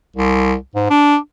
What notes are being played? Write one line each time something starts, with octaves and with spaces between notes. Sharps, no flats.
C2
G#2
D4